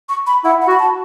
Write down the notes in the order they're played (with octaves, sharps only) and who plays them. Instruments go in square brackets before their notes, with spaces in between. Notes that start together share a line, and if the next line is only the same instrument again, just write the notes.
[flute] C#6
B5
[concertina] E4 [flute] F#5
[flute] F#5
[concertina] F#4
[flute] B5
A5